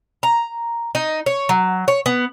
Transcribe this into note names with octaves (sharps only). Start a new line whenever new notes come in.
A#5
D#4
C#5
F#3
C#5
B3